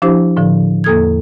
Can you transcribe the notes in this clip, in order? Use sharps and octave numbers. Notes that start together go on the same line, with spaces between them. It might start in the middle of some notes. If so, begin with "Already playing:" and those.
F3 D4 E4 G4 C5
A2 D3 F3
E2 A#3 A4 D#6 F6 G#6